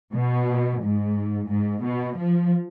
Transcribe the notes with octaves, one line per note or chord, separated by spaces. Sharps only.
B2
G#2
G#2
B2
F3